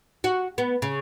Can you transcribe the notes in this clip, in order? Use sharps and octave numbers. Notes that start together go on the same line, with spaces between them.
F#4
B3
C#3